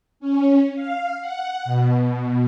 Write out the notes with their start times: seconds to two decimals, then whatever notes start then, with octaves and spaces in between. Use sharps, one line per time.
0.20 C#4
0.75 F5
1.21 F#5
1.65 B2